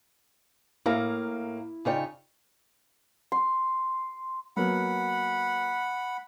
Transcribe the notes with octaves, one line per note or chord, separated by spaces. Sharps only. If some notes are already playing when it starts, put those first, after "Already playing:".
A2 A#3 E4 F5 A#5
C#3 D#4 F4 C#5 D5 G5
C6
F#3 A#3 B3 F#5 B5